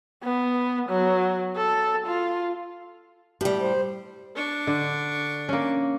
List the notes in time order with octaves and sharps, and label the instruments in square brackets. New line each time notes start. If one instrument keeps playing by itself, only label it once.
[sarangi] B3
F#3
A4
F4
[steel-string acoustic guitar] A2 G3 [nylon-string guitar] G4
[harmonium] C5
[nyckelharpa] D4 C#6
[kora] D3
A#3 C#4